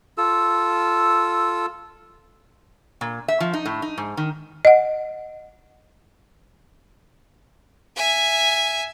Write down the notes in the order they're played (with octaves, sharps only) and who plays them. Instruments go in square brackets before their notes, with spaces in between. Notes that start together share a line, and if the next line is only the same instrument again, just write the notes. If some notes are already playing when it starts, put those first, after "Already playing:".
[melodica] F4 A4 E6
[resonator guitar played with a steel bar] A#2
E5
F3
D#4
A2
D#4
G#2
D#3
[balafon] D#5 F#5
[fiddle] E5 G#5